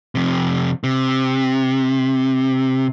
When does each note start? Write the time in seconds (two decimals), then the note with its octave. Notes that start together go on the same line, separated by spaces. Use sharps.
0.15 F2 C3
0.84 C3